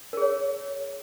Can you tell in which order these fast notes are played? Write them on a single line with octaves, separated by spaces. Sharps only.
A#4 G#4 C#5